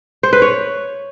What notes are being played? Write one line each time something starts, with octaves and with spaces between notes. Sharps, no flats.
C5
B4
C#5